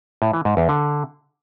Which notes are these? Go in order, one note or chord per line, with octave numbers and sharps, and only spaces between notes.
A2
E3
G#2
E2
D3